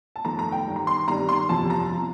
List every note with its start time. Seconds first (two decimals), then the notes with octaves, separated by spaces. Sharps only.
0.16 A5
0.25 G1 F2 D#3 A3 A#5
0.39 A#5
0.52 G5
0.66 G1 G2 D#3
0.76 A#5
0.87 C6
1.08 G2 D#3 G3 C4 D#4 A#5
1.29 C6
1.49 G1 F2 C3 F3 C4 A5
1.70 A#5
1.91 F3